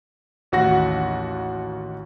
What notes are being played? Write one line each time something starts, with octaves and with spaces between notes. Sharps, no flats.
A1 D#2 F#4 F#5 A#6